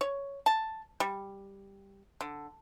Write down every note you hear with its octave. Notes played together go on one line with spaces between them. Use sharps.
C#5
A5
G3
D3